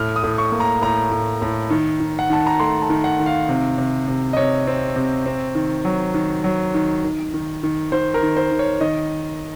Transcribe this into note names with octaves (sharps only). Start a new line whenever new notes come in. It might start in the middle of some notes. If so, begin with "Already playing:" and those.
Already playing: A2 F6
D#6
A2
C#6
A#3
A#5
A2 A#5
A2
A2
D#3
D#3
F#5
D#3 A5
A#5
A3 C6
A5
D#3
F#5
D#3
F5
C3
C3
C3
D#5
C3 C#5
C4
C3
C4
D#3
F#3
D#3
F#3
D#3
D#3
D#3
D#3
D#3 C5
A#4
D#3
C5
D#3
C#5
D#3 D#5